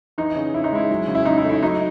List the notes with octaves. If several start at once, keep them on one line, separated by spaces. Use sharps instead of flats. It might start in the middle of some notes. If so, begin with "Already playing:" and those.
E3 D#4
C#3
C#3 E4
D#4
G#3 E4
F#3
C#3
E4
C#3 D#4
E4
A3
E4
F#3 D#4